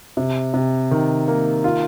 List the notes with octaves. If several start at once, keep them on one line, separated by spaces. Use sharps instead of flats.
C3
C3
D#3
A#3
F4